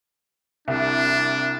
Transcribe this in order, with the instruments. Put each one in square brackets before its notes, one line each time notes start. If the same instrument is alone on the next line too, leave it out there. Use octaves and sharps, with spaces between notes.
[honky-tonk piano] C2 [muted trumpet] D4